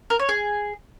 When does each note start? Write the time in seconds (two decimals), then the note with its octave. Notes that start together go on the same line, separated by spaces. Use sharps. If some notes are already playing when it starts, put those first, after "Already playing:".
0.10 A#4
0.19 C#5
0.29 G#4